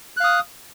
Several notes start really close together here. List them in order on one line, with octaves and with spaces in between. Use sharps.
F#6 F5 D#6